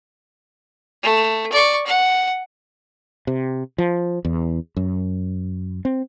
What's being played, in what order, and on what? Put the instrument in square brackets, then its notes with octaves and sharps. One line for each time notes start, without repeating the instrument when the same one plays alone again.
[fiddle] A3
D5 C#6
F#5
[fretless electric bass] C3
F3
E2
F#2
C4